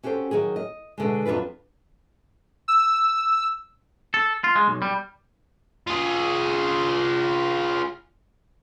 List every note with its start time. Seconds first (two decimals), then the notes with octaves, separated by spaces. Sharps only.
0.03 C#4 F#4 G4 A4 C5
0.31 D#3 F#3 F#4 G#4
0.56 D#5
0.98 B2 D3 G#3
1.26 F2 F#3 D4 F4 B4
2.68 E6
4.14 A4
4.44 F4
4.56 G#3
4.68 B1
4.82 G3
5.87 F4 G#4